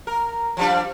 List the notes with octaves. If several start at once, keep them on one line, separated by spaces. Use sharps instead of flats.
A#4
F3 G3 D4